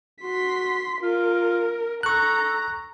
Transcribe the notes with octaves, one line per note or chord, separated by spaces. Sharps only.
F#4 C6 B6
F4 A#4
A4 A#5 C#6 F#6